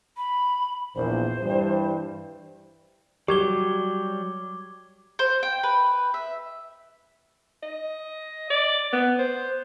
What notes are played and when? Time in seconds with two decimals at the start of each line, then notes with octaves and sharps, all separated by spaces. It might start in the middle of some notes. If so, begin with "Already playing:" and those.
0.17 B5
0.95 A#1 E2 A#2 C5
1.42 G2 E3 G3
3.28 F#3 G3 G4 D6 G#6 G7
5.19 C5
5.43 G5
5.63 B4
6.14 E5
7.63 D#5
8.50 D5
8.93 B3
9.19 C5